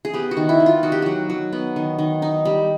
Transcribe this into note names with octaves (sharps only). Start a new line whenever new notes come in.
G#4
B3 G4
F#4
D#3
E4
D#3
F4
D#4 F#4
G4
F#3 F#4
F#3
B3
D#3
D#3
D#4
G3